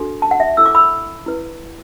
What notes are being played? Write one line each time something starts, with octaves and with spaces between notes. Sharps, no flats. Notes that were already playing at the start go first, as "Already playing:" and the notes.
Already playing: D4 F#4 A4
A5
F#5
E5
E4 A4 E6
D6
B5 E6
E4 B4